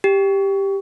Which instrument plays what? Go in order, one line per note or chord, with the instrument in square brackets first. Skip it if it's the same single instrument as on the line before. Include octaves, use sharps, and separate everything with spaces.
[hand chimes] G4